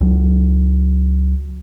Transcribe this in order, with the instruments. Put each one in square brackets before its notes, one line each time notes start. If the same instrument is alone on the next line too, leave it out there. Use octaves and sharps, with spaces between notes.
[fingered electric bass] C#2 F#3